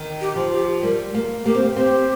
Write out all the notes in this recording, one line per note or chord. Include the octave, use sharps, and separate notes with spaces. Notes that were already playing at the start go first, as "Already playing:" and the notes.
Already playing: D#3
G4
F3
G4
G3 A#4
A#3
A#3 G4
C4
A#3
C4 G4